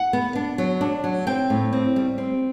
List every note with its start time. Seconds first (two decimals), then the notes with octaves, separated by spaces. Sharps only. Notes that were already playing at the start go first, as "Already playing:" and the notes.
Already playing: F#5
0.13 B3
0.35 D4
0.58 F#3
0.81 D4
1.04 F#3
1.27 C4 G5
1.50 A2
1.73 C4
1.96 G3
2.18 C4